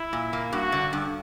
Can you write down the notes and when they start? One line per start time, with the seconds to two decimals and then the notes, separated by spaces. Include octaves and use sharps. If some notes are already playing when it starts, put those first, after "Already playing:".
Already playing: E4
0.13 A#2
0.33 A#3
0.53 G2 F#4
0.72 D3
0.93 G2